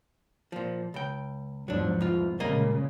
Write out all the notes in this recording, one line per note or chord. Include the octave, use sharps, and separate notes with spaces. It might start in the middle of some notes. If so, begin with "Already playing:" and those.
A#2 F3
C#2 G5
E2 G#2 F3 F#3 D4
C2 F4
A#2 C#3 G3 G#3 A#3 D#5